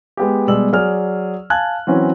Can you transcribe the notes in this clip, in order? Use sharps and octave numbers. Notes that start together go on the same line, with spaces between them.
G#3 B3 G4
B2 G3 G#3 E6 F#7
F#3 G#4 D5 F6
F5 G#5 A5 F#6 G#6
E3 F#3 C4 C#4 F#4